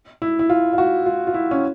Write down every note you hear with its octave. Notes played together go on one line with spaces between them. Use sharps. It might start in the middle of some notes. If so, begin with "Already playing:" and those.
E4
E4
F4
F4
F#4
F4
F4
E4
C#4